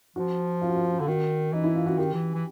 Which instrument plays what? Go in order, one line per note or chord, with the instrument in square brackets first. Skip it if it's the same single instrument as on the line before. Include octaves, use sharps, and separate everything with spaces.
[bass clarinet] F3 [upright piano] F#4
[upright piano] F4
F#4
F4
[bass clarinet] D3
[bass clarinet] D#3 [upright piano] F#4
[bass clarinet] E3 [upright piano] D#4
[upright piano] E4
F4
F#4
[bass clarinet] D#3 [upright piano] G4
[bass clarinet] E3
E3